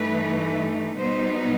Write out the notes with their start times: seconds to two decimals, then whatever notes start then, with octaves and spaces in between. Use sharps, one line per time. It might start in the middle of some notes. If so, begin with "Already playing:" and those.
Already playing: G2 E3 A3 D#4 B4
0.99 B2 G3 B3 D#4 C5